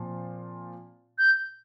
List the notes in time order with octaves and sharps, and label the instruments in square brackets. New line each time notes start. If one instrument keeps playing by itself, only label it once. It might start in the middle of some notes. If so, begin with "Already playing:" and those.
Already playing: [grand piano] A#2 F3 C4 F4
[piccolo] G6